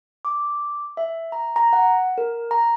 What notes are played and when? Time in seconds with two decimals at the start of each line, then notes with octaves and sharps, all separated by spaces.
0.25 D6
0.97 E5
1.32 A#5
1.56 A#5
1.73 F#5
2.18 A#4
2.51 A#5